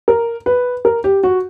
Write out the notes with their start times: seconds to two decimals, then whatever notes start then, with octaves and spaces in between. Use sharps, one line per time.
0.08 A#4
0.46 B4
0.85 A#4
1.04 G4
1.24 F#4